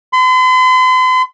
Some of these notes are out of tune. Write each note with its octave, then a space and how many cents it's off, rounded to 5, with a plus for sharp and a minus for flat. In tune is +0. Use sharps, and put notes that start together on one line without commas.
C6 -45